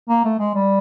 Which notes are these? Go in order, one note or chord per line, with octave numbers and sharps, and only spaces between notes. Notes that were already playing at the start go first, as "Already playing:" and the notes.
A#3
A3
G#3
G3